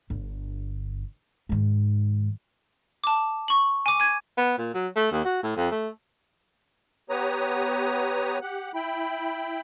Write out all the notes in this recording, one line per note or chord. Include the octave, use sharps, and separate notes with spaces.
G1 D3
G#2 D#3
A5 D6
C#6 F#7
G#5 D6
G#5 G#6
B3
A#2
F#3
A3
D#2
F#4
A2
F2
A3
B3 G4 B4 C#5 A#5 D#6
G4 F#5 F#6
E4 G5 B5